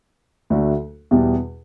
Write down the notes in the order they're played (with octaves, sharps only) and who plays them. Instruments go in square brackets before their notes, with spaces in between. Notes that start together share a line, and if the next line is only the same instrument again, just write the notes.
[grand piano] D2 D3 A3 D4 F#4
E2 B2 G3